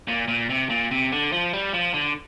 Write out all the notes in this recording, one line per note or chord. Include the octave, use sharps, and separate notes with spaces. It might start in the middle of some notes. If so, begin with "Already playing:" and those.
A#2
A#2
C3
A#2
C3
D3
F3
G3
F3
D3